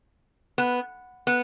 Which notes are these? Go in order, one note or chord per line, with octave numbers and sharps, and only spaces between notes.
B3
B3